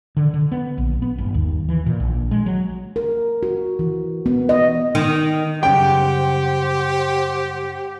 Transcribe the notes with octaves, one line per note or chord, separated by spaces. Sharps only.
D3
D3
B3
A#1
B3
G1
D#2
E3
A#2
A#1
G#3
F#3
A#4
F#4
E3
B3
D#5
D#3
F#2 C#3 G3 G4 C5 F#5 G5